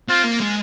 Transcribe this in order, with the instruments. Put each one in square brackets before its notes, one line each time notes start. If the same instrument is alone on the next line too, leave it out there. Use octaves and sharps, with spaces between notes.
[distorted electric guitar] C4 [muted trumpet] F4
[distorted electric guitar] A#3
G#3